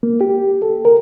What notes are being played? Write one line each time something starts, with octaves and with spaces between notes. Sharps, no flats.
A#3
G4
A4
A#4